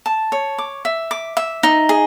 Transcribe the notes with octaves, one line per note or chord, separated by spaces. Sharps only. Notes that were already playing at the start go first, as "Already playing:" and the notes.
A5
C#5
D6
E5
D6
E5
D#4
G#4